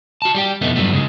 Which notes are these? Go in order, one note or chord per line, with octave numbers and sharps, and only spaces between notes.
F#4 A5
G3 G4 G5
F2 B2 E3 A3 B3 D#4
G2 E3 F#3 G3 A3 B3
C#3 G#3